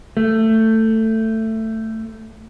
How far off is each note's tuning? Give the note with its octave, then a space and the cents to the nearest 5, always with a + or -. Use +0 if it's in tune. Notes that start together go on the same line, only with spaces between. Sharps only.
A3 +15